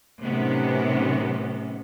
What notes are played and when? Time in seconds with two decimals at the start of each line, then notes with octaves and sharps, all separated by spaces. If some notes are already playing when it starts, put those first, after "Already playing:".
0.20 A2 C3 D#3 F#3 B3 C#4